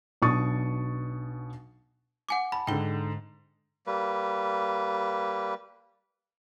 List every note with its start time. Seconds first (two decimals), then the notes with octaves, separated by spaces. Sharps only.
0.22 B1 B2 D4 C#6 D#6 A6
2.29 F#5 G#5 D6
2.52 A5 B5
2.67 G#2 D3 G5 G7
3.87 G3 A#3 B4